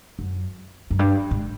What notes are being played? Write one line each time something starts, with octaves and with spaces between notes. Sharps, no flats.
F#2
F#2
G2
G#2